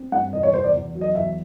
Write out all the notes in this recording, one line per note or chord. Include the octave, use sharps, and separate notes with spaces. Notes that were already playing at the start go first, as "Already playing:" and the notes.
Already playing: C4
G2 F#5
E2 D#5
C#5
E2 C5
D5
E2
F#3
D#5
E2 E5